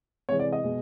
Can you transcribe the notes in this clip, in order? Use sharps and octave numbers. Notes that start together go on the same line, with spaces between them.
C3 E3 G#3 C#5
D5
D#5
B2 G#3